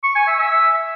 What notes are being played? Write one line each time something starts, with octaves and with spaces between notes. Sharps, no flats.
C#6
G#5
E5
E5